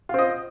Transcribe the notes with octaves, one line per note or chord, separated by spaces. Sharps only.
C4 F4 D#5